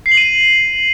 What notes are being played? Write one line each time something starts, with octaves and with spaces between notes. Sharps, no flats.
C7
F#7
D#7